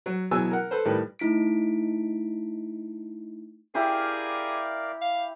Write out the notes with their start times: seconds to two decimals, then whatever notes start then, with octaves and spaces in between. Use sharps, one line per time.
0.06 F#3
0.31 B2 E3 F#3 G#4 G#5 E6
0.51 A#4 F#5
0.71 A4 B4 C5
0.85 A2 D#3 G3 B4
1.19 A3 D#4 E4 B6 D7
3.75 E4 G4 G#4 A#4 D5 F5 D6
5.02 F5